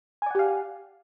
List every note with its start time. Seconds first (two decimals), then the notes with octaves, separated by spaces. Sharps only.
0.22 G#5
0.26 D5
0.31 F#5
0.35 G4
0.39 F5